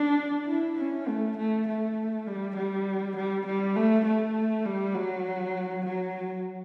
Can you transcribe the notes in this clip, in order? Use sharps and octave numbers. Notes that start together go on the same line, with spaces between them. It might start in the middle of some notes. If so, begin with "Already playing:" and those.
Already playing: D4
E4
C#4
A3
A3
A3
G3
G3
G3
G3
A3
A3
G3
F#3
F#3